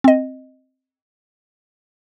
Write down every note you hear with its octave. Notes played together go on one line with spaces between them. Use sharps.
C4 D#5